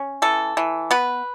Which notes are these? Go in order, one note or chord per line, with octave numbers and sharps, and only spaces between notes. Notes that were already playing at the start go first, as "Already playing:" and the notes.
Already playing: C#4
E3 A4
E3
B3 B4